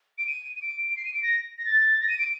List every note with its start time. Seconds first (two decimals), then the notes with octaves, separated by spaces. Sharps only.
0.18 D7
0.27 D#7
0.56 D#7
0.62 D7
0.96 C7
1.05 D#7
1.14 D7
1.23 A#6
1.58 A#6
1.65 A6
2.01 A#6
2.09 D#7
2.19 D7